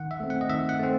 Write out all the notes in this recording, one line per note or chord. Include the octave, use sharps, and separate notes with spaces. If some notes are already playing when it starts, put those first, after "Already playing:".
Already playing: D#3 F#5
E5
A3 C4
F#5
D#5
D#3 E5
F#5
A3 C4